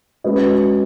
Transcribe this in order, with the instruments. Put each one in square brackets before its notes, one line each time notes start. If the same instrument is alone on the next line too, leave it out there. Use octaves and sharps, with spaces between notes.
[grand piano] G#3 C#4 F#4 B4 D#5